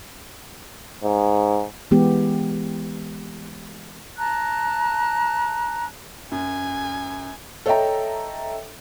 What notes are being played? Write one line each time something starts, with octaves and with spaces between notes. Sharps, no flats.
G#2
E3 G#3 B3 G4
A5 A#5 F#6
F#2 G#5
A4 C#5 D#5 E5 G5 A#5